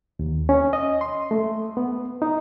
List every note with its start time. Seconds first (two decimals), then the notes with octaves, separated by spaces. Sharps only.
0.19 D#2
0.49 C#4
0.73 D#5
1.01 C6
1.31 A3
1.77 B3
2.22 D#4